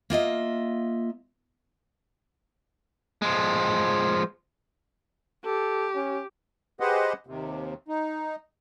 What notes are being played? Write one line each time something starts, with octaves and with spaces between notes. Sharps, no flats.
A#3 F4 D#5 E5
F3 G#3
G4 A4
C#4
G4 G#4 B4 C5 D#5 F#5
D#2 C3
D#4